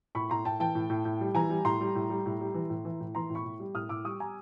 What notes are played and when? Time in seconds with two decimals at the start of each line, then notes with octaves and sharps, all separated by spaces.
0.15 A2 B5 C#6
0.30 A2 A#5 C6
0.45 A2 G5 A5
0.60 E3 G5 A5
0.75 A2
0.90 A2
1.05 A2
1.21 G3
1.35 E3 G#5 A#5
1.50 G3
1.65 A2 A#5 C6
1.81 G3
1.95 A2
2.10 G3
2.26 A2
2.40 G3
2.54 E3
2.70 A2
2.85 E3
3.00 A2
3.15 E3 A#5 C6
3.30 A2
3.35 B5 C#6
3.45 A2
3.60 G3
3.75 A2 D#6 F6
3.89 A2 D6 E6
4.04 G3 C#6 D#6
4.20 G3 G#5 A#5